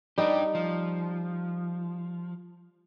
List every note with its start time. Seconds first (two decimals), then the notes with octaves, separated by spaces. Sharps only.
0.18 G3 D4 D#4 G4
0.55 F3